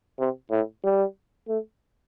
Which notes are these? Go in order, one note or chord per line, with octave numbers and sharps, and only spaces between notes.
C3
A2
G3
A3